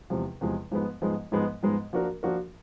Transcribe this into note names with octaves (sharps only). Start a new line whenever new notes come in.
E2 C3 F3 G#3
E2 C3 F3 G#3
G#2 F3 G#3 B3
G#2 F3 G#3 B3
G#2 F3 G#3 B3
G#2 F3 G#3 B3
F3 A#3 D4 F#4 A#4
F3 A#3 D4 F#4 A#4